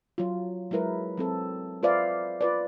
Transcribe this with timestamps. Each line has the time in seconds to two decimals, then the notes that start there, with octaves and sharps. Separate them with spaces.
0.18 F#3 F4
0.71 F#3 G#3 E4 A#4 B4
1.17 F#3 C4 A4
1.83 F4 B4 C5 D5 E5 F5
2.41 F4 B4 D5